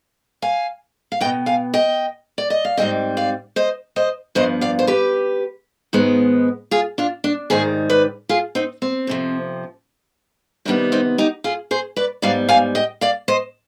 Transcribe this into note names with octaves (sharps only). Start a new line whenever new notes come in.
F5 G#5
F5
B2 B3 D#5 G5
F5 G#5
D#5 G5
D5
D#5
F5
G#2 G3 C4 D#5 G5
D5 F5
C5 D#5
C5 D#5
G2 F3 B3 C5 D#5
D5 F5
C5
G4 B4
G#2 D#3 G#3 B3
F4 G#4
D4 F4
D4
G#2 D#3 G3 G#4 C5
B4 D5
F4 G#4
C4 D#4
C4
F2 C3 F3
C3 D#3 G3 B3 D4
C4 D#4
D#4 G4
F4 G#4
G#4 C5
B4 D5
G#2 G3 B3 D5 F5
F5 G#5
D#5 G5
D5 F5
C5 D#5